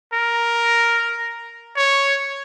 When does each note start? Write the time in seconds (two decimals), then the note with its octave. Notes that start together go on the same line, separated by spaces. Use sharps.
0.13 A#4
1.77 C#5